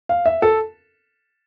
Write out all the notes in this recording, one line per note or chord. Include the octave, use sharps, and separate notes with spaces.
F5
E5
A4